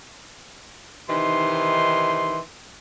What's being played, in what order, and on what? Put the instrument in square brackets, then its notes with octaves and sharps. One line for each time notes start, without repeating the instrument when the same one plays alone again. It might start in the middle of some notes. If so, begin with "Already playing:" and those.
[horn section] C3 D#3 E3 D#4 C6